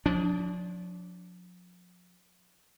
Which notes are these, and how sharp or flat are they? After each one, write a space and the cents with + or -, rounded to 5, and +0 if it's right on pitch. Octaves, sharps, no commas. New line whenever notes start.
F3 +45 D4 -25